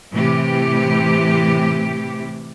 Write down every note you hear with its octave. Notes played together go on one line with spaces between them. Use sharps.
A2 C3 E3 G4